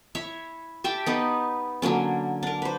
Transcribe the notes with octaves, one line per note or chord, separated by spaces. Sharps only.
E4 C#5 E5
G4 E5 G5 A5
B3 D#4 B4
D3 F#3 A#3 C#4
D4 A#4
B4 C5